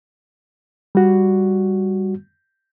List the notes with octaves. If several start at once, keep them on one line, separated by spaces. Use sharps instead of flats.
G3 F#4